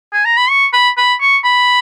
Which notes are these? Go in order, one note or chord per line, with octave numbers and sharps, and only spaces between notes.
G#5
A#5
B5
C#6
B5
B5
C#6
B5